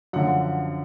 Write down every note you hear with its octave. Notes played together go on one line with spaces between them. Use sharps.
F#2 D3 F3 F#5